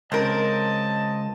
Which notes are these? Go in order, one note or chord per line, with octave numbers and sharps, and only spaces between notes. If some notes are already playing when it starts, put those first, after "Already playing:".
C#2 C4 A#4 D#5 A5